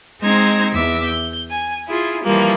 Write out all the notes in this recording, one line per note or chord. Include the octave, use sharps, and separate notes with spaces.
G#3 C4 D#4 C5 A#5 G#6
E2 E5 D6
G6
G#5
E4 F4 G#4
E3 F3 G3 A#3